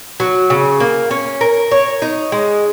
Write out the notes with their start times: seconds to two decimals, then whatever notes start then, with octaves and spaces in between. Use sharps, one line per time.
0.20 F#3
0.50 C#3
0.80 A#3
1.11 C#4
1.41 A#4
1.71 C#5
2.02 D#4
2.32 G#3